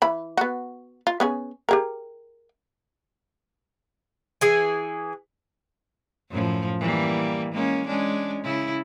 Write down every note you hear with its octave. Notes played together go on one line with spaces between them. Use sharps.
E3 B5
B3 F#4
F4
B3 C#4 G#4
G4 G#4 A#4
E3 G#4 G#5
F#2 A2 F3
E3 G3 A#3
G#3 A#3 C#4
G#3 C#4 D4
C#3 E4